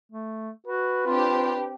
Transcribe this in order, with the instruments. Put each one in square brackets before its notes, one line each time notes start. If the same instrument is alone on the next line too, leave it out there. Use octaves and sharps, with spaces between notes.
[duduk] A3
[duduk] F#4 [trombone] B4
[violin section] C4 D4 G4 [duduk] F4